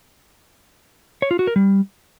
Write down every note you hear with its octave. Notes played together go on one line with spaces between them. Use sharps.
C#5
F4
F#4
A#4
G3